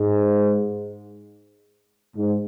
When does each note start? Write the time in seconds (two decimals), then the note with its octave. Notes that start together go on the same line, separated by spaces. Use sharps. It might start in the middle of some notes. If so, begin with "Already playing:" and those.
Already playing: G#2
2.16 G#2